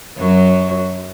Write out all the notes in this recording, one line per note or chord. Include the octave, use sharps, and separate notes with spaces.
F#2 F#3